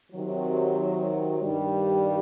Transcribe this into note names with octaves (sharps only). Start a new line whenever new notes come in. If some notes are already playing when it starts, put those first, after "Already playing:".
C3 D#3 F#3
G2 D#3 G3